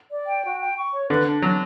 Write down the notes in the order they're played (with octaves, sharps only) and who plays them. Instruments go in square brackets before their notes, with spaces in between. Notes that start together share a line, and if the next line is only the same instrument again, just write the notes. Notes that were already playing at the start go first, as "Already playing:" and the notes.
[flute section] D5
G5
F#4
G5
C#6
C#5
[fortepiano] D3 [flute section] B4
[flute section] D4
[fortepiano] F#3 [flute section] D4